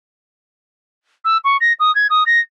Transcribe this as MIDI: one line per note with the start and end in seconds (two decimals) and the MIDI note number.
1.25 1.37 88
1.44 1.57 85
1.60 1.73 94
1.79 1.94 87
1.95 2.07 92
2.10 2.23 87
2.26 2.40 94